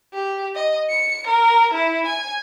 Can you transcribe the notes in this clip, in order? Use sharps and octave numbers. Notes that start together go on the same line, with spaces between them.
G4
D#5
C#7
A#4
E4
G#5